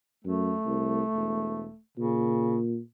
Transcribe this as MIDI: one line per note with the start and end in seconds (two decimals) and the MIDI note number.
0.25 0.53 42
0.25 1.80 57
0.66 1.02 36
1.14 1.65 28
1.97 2.79 46
1.97 2.61 49